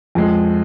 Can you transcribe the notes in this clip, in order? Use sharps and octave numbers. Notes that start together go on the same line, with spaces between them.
F2 F3 G#3